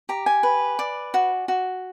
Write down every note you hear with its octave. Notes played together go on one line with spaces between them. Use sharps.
G4 A#5
G#5
B4
D5
F#4
F#4